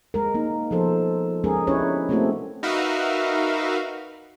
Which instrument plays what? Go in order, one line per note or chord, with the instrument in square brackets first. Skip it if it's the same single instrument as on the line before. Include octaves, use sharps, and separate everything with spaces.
[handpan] G#3 A#4
A#3 D#4
F3 B3 A4 C5
G#3 C#4 G#4 A#4
C#4 D4 E4 G4 B4 C#5
A3 A#3 C4 E4 F#4 A4
[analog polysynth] D#4 F#4 A#4 B4 E5 F5